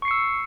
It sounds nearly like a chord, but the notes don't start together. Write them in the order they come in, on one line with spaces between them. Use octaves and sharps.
C#6 C7 C#7 E6